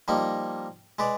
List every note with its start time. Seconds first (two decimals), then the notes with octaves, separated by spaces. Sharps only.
0.08 F3 G3 A#3 D#4
0.99 G#3 B4 D5